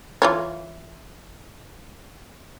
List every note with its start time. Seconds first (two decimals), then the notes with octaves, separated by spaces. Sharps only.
0.22 E3 F4 C#5